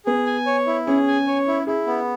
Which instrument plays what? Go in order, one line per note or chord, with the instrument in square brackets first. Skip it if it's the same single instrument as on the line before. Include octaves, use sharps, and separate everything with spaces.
[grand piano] B3 [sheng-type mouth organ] G#4
[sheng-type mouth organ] G#5
C#5
E4
[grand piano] C#4 [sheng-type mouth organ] G#4
[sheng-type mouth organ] G#5
C#5
E4
[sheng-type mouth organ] E4 [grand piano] G#4
[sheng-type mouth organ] B3